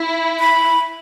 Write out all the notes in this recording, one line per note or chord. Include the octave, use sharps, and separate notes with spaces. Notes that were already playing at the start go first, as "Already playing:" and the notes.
Already playing: E4
B5